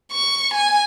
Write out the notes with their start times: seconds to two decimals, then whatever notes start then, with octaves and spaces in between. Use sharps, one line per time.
0.12 C#6
0.54 G#5